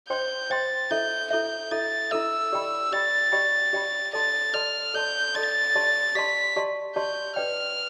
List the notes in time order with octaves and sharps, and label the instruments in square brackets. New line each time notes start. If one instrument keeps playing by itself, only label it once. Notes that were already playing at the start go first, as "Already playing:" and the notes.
[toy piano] C5 G5 C6 [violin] G6
[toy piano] C5 G5 C6 [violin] A6
[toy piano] E4 A4 E5 [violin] G6
[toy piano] E4 A4 E5 [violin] G6
[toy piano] E4 A4 E5 [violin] A6
[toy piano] E4 A4 E5 [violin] E6
[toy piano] G4 D5 G5 B5
[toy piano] G4 D5 G5 B5 [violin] A6
[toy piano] G4 D5 G5 B5
G4 D5 G5 B5
[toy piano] A4 D5 A5 C6 [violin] A6
[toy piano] A4 D5 A5 C6 [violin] F6
[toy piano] A4 D5 A5 C6 [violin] G6
[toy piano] A4 D5 A5 C6 [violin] A6
[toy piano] G4 D5 A5 C6
[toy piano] G4 D5 A5 C6 [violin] B6
[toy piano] G4 D5 A5 C6
[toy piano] G4 D5 A5 C6 [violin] G6
[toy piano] B4 D5 G5 [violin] F6